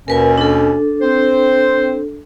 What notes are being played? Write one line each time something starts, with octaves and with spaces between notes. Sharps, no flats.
D#2 B2 C#4 A#4 B4 G#5
D4 A4
C4 C5